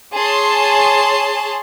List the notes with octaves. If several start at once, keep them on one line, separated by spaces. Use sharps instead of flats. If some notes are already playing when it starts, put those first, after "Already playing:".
G#4 C#5 A5 C6